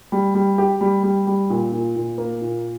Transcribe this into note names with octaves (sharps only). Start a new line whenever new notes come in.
G3
G3
G4
G3
G3
G3
A#2
A#2
A#2
A#3
A#2